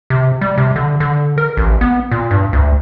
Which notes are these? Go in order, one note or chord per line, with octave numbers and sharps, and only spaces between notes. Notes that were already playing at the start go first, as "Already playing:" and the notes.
C3
G3
C3
D3
D3
A#4
A1
B3
A#2
G2
D2